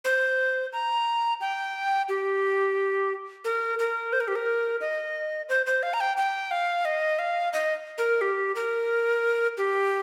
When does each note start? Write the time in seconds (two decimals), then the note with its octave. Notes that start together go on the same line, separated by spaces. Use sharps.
0.05 C5
0.73 A#5
1.41 G5
2.09 G4
3.45 A#4
3.79 A#4
4.13 C5
4.20 A#4
4.28 G4
4.36 A#4
4.81 D#5
5.49 C5
5.66 C5
5.83 F5
5.94 A#5
6.00 G5
6.17 G5
6.51 F5
6.85 D#5
7.19 F5
7.53 D#5
7.98 A#4
8.21 G4
8.55 A#4
9.58 G4